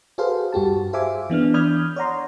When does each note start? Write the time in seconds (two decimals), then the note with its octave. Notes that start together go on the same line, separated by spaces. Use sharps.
0.18 F#4 G#4 A4 B4 C5 F5
0.52 G2 F#4 G4 A5
0.93 G#4 C5 E5 F5 G#5 D6
1.30 E3 B3 D4 F6
1.54 D5 B5 D#6 F6 G6 G#6
1.96 C#5 D5 F#5 A#5 C6